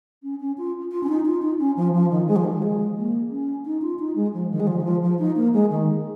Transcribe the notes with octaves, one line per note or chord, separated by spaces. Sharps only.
C#4
C#4
F4
F4
C#4
D#4
F4
D#4
C#4
F3
F3
D#3
G#3
F3
D#3
F3
G#3
A#3
C#4
D#4
F4
D#4
G#3
F3
D#3
G#3
F3
D#3
F3
F3
D#4
A#3
G#3
D#3